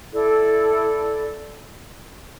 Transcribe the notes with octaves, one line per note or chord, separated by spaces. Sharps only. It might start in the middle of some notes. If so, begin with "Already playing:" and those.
E4 A4 D5